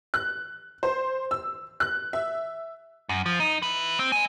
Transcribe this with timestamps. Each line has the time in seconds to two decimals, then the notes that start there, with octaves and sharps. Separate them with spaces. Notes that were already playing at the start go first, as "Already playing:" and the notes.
0.14 F#6
0.83 C5
1.31 E6
1.80 F#6
2.13 E5
3.09 F#2
3.26 F3
3.40 D#4
3.62 E4 B4
3.99 C4
4.12 D#5 G#5